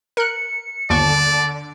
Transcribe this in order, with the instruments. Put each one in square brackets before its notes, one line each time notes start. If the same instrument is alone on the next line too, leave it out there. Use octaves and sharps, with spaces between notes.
[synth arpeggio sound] A#4 F#6 [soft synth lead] C#7
[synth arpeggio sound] G1 D#2 C#6 [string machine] D3 [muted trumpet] D5 [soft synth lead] A5